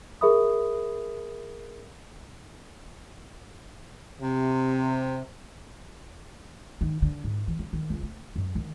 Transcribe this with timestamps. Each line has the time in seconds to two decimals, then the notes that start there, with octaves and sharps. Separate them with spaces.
0.21 G#4 A#4 E5 B5 D#6
4.21 C3
6.81 D#3
7.02 D3
7.24 G#2
7.48 E3
7.59 C#4
7.73 D#3
7.90 C#2
8.03 A3
8.36 F#2
8.55 D#3